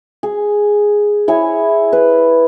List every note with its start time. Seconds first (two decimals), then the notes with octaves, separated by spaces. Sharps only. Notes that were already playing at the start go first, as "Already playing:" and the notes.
0.23 G#4
1.28 E4 G#4 C#5 G#5
1.93 B4